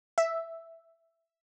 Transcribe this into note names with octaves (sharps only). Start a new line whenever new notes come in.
E5